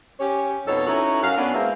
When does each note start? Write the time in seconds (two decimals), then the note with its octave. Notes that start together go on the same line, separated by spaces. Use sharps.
0.20 C#4 G4 C#5
0.67 F2 B2 D#4 A4 C#5
0.87 C#4 D#4 E4 F#4 A4 C#5
1.22 F#2 F5 F#5
1.37 B3 C#4 D4
1.53 G#3 A#3 B3 E4 F4 C5